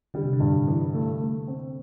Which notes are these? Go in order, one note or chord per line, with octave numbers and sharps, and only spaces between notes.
D3 G3
C3
D3
G2
E3
A3
A3
C4